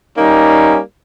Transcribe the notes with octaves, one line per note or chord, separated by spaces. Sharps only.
G3 A#3 C#4 D#4